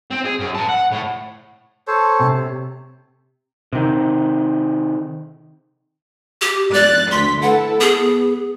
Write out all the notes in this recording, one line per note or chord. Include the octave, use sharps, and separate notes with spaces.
C4
G#4
F#2
B4 A5
F#5
A2
A4 C5 C#5
C3
C3 D#3
G4
D5 F#6 A6
D2 C6 B6
E4 A4 B4 F#5
B3 G#4